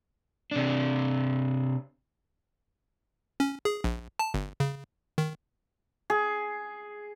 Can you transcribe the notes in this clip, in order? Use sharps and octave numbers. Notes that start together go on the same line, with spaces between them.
C3 D4
C#4
G#4
A#1
A5
G1
C#3
D#3
G#4